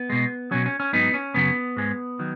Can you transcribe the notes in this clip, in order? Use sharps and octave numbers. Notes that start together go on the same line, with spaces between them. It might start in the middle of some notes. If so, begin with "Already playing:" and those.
Already playing: B3
B2 G#3
B2 F#3 C#4
C#4
C#4
G#2 F#3 B3 D#4
C#4
F#2 C#3 F#3 B3
G#2 G#3
D#3 F#3